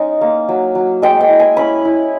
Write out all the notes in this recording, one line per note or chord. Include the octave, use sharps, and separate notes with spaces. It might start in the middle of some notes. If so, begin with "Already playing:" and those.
Already playing: G#3 C#4 D#4
A#3
F#3
F#3
G#3 G5
G5
E4
G#5
C#4 B5
E4